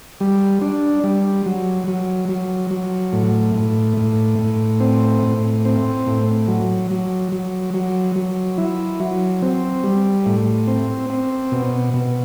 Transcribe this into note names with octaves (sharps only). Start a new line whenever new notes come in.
G3
D4
G3
F#3
F#3
F#3
F#3
A2
A2
A2
A2
C4
A2
C4
A2
F#3
F#3
F#3
F#3
F#3
E4
F#3
C4
G3
A2
C4
C4
B2
B2